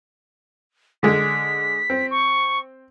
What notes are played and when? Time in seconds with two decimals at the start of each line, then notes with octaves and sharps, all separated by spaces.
1.03 D3 G#3 B6
1.90 C4
2.11 C#6